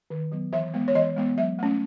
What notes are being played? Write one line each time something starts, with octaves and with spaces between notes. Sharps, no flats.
D#3
F#3 B3
E3 E5
G#3 B3
C#5
E3 D#5
G#3 B3
F#3 E5
A3 C#4